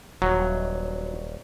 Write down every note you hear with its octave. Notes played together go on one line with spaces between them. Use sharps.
D#1 F#3